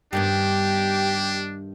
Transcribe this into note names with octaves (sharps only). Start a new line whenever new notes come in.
G2 D#3 B3 D4 G4